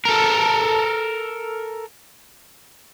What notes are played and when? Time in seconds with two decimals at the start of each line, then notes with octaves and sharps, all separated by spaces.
0.05 A4 A#4